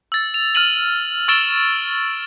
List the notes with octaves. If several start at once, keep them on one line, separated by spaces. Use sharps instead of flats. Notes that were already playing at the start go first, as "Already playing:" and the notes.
E6 A6
F7
F6 A6 D#7 F#7
C#6 E6 A6 D7 E7 G7